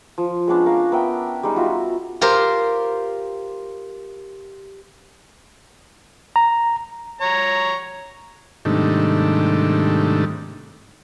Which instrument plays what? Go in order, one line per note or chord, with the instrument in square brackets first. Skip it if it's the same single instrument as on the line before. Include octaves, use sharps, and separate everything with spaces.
[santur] F3
G#3 B3 C#4 D4
A#4 F5
B3 A#4 E5 G5
G3 G#3 D#4
F4 F#4 E5
[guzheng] F4 G4 A#4 C5
[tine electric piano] A#5
[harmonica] C#5 A#5
[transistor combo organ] G#2 C3 D#3 G3 A3 D4